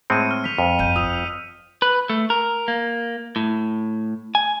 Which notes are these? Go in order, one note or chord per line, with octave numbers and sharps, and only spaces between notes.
A2 G#3 C4 C#7 D#7
F6
B6 F7
F2
F#1 G6 D#7 F7
F4 D#6 E6 F7
B4
A3
A#4
A#3
A2
G#5